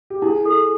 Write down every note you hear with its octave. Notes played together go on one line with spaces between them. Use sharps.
G4
E4 G#4
A4